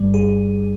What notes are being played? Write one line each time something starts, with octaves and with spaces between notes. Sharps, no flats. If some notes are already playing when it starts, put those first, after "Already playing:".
Already playing: G1 G2 G3
G1 G#4